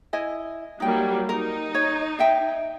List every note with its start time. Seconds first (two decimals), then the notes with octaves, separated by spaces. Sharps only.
0.13 E4 D#5 G#5
0.80 F#3 G3 A#3 D#4 G5
1.29 D#4 A#4
1.75 C#5
2.19 D#5 E5 G5